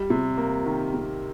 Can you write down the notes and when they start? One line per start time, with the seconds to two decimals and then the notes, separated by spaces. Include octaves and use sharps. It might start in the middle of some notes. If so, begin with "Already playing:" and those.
Already playing: G3
0.10 C3
0.38 A#3
0.66 D#3
0.94 C3